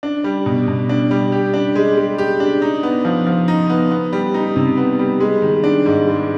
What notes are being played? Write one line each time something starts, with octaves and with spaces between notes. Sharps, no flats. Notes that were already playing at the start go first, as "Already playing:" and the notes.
D4
G3
B2
B2
D4
G3
G4
D4
G#3
G#3
G4
D4
D#4
B3
F3
F3
D#4
B3
B3
G3
D#4
C3
B3
G3
G#3
D#3
D4
G#2
G#3